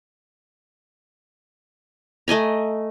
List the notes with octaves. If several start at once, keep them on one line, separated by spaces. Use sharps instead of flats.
A3 D#5 G#5 A#5